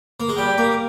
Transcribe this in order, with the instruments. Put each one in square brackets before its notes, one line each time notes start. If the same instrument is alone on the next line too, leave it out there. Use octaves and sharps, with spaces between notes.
[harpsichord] A#3
G#3
[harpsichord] G3 [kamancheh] G4
[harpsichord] A#3